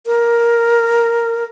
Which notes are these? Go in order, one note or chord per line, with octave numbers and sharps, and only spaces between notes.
A#4